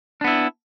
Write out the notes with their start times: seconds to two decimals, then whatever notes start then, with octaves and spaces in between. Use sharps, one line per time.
0.21 D4
0.24 B3
0.28 E4